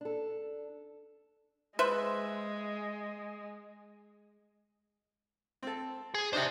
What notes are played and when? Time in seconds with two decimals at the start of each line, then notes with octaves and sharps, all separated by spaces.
0.01 D4 A4
1.79 G#3 B4 C5 E5
5.63 C4 A4
6.14 G#4
6.33 D4 D#4 G4 C5 E5